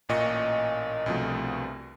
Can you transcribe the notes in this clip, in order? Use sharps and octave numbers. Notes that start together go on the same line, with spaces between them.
A1 A#2 D#5 C#6 C#7
C2 G2 B2 F3 A3